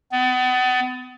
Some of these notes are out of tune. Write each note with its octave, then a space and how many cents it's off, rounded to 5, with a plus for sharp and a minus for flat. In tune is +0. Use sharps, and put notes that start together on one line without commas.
B3 +35